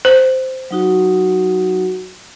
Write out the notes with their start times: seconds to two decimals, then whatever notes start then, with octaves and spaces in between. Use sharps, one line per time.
0.05 C5
0.71 F#3 D#4 F#4